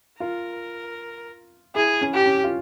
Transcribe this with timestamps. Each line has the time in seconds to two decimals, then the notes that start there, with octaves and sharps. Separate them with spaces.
0.20 F4 A#4
1.75 E4 G#4
2.01 C#4
2.14 G4
2.26 C#4
2.44 F4